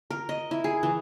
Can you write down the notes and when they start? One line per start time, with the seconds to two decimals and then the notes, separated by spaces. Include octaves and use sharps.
0.11 A#4
0.29 D#5
0.51 E4
0.64 G#4
0.83 E3